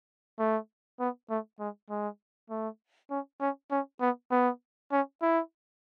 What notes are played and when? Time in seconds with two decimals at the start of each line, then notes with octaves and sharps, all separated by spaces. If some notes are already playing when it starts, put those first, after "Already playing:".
0.39 A3
1.00 B3
1.30 A3
1.60 G#3
1.90 G#3
2.50 A3
3.10 C#4
3.41 C#4
3.71 C#4
4.01 B3
4.31 B3
4.92 C#4
5.22 E4